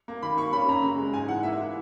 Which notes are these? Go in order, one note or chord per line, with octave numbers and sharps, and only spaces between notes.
A#3
D#3 B5
A#3 C#6
C#4 B5
F#2 A#5
C#3
G#3
G#2 G#5
E3 F#5
A#3 E5
E4